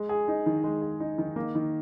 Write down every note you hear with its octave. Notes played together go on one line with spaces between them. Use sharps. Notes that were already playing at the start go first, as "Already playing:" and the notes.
Already playing: G#3
G#4
D#4
D#3
G#3
G#4
D#4
D#3
A#3
D#3